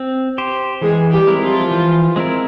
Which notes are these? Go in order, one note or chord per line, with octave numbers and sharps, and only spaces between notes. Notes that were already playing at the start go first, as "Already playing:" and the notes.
Already playing: C4
G4 C5
E3 G#3 G#4
G3 G4
G#3 C4 E4 A#4
F3 F4
E3
G#3 C4 E4 A#4